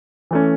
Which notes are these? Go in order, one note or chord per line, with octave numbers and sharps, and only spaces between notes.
E3 A3 C#4